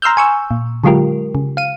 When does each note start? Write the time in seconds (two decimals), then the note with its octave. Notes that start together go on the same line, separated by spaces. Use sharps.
0.02 A#5 C6 E6 F6 G6
0.17 G#5 C#6 E6
0.51 A#2
0.84 D3 F#3 G#3 F4 G4 A#4
1.35 C#3
1.57 F5 D#7